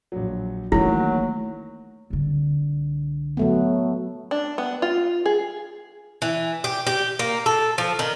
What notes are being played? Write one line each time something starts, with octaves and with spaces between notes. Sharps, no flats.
A#1 F#3
D#3 E3 F#3 A3 A#3 E4
C2 D3
F#3 A3 B3
D4
B3
F4
G#4
E3
G4
G4
A#3
A4
F3
D#3